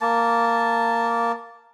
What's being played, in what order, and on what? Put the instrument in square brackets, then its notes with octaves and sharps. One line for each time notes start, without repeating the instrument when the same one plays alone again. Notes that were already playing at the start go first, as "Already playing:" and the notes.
[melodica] A#3 A5